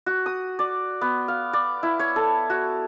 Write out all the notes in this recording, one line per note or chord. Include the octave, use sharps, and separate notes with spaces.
F#4
D#6
D5
B3
F5
D5
E4
C#5
A4
F#4